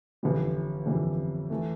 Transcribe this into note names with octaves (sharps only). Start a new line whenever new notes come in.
G1 F2 E3 G3
G1 F2 E3 G3
E3 A3